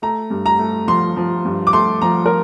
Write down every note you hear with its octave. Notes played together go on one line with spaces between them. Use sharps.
A3 A#5
G2
A#5
A3
F3 C6
F3
G2
D6
A3 C6
F3 A#5
A#4